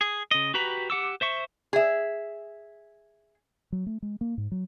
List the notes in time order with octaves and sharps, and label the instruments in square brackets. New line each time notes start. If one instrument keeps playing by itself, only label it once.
[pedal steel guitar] G#4
C#3 D#5
F#4 G4 B4 A#5 B5
G4 F#5 D6 E6
C5 E5 C#6
[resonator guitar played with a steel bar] G#4 E5
[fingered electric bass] F#3
A3
G#3
A#3
G#2
F#3